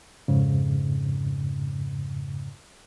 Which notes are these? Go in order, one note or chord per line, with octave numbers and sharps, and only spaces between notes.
F2 G#2 C#3